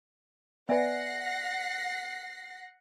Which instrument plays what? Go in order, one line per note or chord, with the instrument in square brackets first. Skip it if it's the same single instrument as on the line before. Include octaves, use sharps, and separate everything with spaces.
[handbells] B3 B4 [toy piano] D5 E5 G#5 [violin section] F#5 A#6 C7